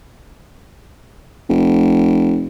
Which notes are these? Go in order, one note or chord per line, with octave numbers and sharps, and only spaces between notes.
F1